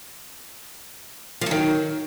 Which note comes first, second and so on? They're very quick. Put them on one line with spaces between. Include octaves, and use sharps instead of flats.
F3 F#3 D#3